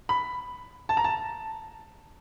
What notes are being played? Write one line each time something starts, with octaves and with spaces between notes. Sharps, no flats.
B5
A5
A#5
A5